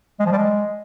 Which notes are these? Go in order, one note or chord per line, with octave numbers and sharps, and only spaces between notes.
G#3
F3
G3
G#3